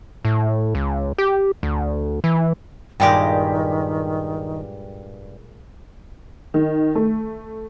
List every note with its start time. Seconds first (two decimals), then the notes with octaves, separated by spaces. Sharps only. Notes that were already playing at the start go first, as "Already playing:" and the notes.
0.25 A2
0.75 C#2
1.18 G4
1.63 D2
2.24 E3
3.00 G2 A#2 D#3 G#3 G4 G5
6.54 D#3
6.95 A3